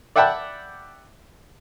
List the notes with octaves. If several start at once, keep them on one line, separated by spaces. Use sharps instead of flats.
D5 E5 F#5 G5 A5 B5